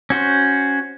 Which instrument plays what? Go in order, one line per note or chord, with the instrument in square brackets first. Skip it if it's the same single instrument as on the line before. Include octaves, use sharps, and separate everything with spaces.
[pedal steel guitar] C#4 F#4 C5